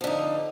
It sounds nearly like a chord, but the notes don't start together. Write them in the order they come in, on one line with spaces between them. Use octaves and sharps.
F3 D3 D#4